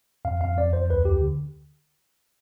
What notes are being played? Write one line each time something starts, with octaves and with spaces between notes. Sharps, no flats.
F2 F5
F2 F5
F2 D5
F2 C5
D2 B4
D2 G4
D3